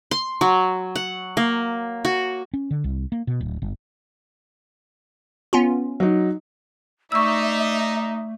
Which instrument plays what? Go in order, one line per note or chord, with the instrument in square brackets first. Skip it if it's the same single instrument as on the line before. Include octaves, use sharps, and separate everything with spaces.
[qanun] C6
F#3
F#5
A#3
F#4
[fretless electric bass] C#4
D3
C2
A#3
B2
D1
G1
[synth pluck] B3 C#4 F4
[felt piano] F#3 D#4
[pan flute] A3 [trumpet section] D#4 [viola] D5 E5 [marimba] C#6 E6